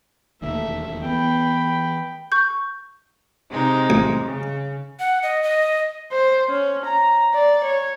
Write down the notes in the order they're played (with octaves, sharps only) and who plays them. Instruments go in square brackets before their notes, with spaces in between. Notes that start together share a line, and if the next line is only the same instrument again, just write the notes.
[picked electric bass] E1 D#2 A#3 [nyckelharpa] A3 E5
[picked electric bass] E3 B3 [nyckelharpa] G5 B5
[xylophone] C#6 G6
[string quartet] C3 G#3 D#4
[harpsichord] A1
[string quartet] C#3
[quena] F#5
D#5
D#5
[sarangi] C5
C#4
A#5
D5
C#5